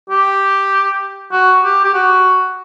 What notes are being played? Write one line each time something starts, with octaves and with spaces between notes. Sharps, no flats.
G4
F#4
G4
G4
F#4